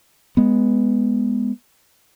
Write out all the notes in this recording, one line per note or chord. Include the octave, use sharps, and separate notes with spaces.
G#3 B3